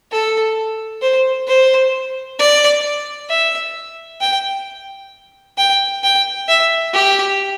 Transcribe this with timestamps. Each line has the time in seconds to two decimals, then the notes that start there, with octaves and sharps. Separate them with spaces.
0.12 A4
1.02 C5
1.48 C5
2.39 D5
3.30 E5
4.21 G5
5.58 G5
6.04 G5
6.48 E5
6.94 G4